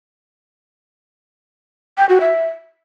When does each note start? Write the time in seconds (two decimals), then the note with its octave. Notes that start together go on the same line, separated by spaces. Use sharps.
1.98 G5
2.09 F#4
2.21 E5